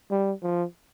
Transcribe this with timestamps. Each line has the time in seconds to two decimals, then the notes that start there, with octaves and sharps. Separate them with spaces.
0.11 G3
0.42 F3